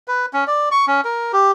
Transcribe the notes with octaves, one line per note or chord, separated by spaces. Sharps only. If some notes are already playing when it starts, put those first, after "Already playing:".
B4
C#4
D5
C#6
C#4
A#4
G4